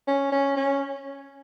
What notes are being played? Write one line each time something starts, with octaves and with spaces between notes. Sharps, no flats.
C#4
C#4
C#4